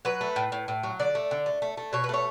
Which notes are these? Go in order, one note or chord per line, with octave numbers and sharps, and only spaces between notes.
F#3 B4
A3
A2
A2
A2
F#3
D3 D5
A3
D3
A3
A3
A3
B2 C#5
B4
A3 C#5